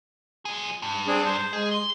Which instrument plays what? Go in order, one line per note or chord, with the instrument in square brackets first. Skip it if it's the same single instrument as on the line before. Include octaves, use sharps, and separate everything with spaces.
[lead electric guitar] F3 G#4
G2
[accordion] C4 D4 G#4
C5
[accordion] G#3 [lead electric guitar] G#4
[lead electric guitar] C6